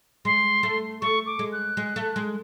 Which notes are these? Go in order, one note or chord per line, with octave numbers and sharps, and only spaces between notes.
G#3 C6
A3
A3 C#6
D6
G#3
F#6
G#3
A3
G#3